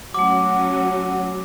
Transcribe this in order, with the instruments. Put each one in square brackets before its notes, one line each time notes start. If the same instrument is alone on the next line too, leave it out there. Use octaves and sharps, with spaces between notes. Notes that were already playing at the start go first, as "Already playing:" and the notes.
[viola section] F#3 C#4 F#4 [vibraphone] A3 F#5 [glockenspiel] D6